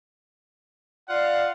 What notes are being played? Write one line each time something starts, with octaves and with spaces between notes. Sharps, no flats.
F4 D5 F5 F#5